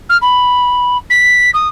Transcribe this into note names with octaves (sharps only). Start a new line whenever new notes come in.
F6
B5
B6
D#6